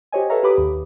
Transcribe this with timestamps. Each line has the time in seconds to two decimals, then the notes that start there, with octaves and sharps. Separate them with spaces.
0.12 G4 C5 C#5 D#5 G#5
0.30 A4 B4 C#5 E5 F5 A#5
0.43 G4 B4 C#5 B5 D6 D#6
0.58 D#2